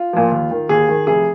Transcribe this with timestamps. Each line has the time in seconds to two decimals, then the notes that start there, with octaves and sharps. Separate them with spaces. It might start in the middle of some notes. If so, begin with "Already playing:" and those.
Already playing: F4
0.13 A#2 F3
0.31 D#2
0.51 D#3
0.69 D#2 G#4
0.89 D#3
1.07 F1 G#4